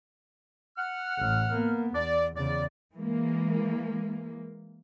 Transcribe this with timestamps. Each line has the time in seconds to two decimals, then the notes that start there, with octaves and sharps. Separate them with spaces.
0.78 F#5 F6
1.18 A1
1.51 A#3 B3
1.95 E2 D5
2.37 E2 C#3 D5
2.94 E3 G#3 A#3